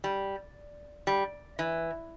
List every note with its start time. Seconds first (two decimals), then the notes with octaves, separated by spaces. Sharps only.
0.04 G3
1.07 G3
1.59 E3